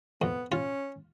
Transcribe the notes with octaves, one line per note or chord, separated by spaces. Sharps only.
F2 B3
C#4 F4